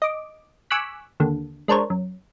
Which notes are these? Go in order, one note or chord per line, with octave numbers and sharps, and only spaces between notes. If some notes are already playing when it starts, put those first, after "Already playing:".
D#5 D6
G#5 C#6 D6 E6 F#6 B6
D#2 D3
G#3 D4 A#4 C5 C#5
F#2